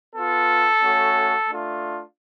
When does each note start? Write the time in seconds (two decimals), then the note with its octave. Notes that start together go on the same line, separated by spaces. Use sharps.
0.15 B3 F4 A4
0.82 A3 C#4 F#4
1.48 A3 D4 F4